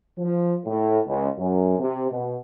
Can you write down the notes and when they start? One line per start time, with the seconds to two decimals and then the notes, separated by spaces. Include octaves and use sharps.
0.18 F3
0.66 A2
1.07 C#2
1.38 F#2
1.79 C3
2.12 B2